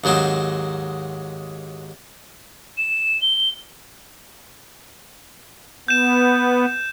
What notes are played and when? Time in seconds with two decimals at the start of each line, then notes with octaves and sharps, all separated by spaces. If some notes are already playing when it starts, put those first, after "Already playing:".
0.04 D#2 G#2 F#3 C4 D#4
2.78 E7
3.22 G7
5.88 B3 G6 E7